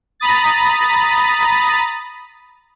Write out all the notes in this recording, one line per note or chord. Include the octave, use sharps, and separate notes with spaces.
A#5 B5 D#6 A6